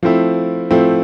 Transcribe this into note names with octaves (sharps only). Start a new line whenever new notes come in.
F3 A3 C4 E4
F3 A3 C4 E4